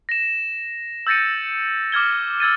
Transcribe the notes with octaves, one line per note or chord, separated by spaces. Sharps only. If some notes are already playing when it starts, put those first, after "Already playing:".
A#6 E7
E6 G6 A6 A#6 C#7 D#7
D6 F6 G#6 G7
E6 G#6 A6 D#7